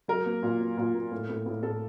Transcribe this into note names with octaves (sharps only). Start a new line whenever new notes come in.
F#3 A#4
A#3
A#2
F#3
A#2
A#3
A2
A2
A2
A2 A4